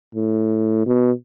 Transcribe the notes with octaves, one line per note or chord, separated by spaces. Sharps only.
A2
B2